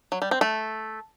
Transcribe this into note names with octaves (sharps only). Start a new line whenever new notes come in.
F#3
G3
C4
A3